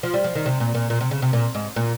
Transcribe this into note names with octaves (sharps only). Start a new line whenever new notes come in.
F3
G3
F3
D#3
C3
A#2
A#2
A#2
C3
C#3
C3
A#2
G#2
A#2